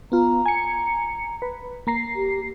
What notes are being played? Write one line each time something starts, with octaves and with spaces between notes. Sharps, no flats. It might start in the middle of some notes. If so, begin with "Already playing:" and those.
B3 F4 A#5
G#5 C#7
B4
A#3 A#5 C7
G4